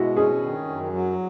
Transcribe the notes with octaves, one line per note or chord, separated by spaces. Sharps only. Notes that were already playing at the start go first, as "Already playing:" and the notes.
Already playing: B2 G#3 E4 F#4
C#4 G#4
D#3
F#2
F#3